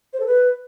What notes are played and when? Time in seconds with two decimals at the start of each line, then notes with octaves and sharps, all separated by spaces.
0.13 C5
0.20 A4
0.26 B4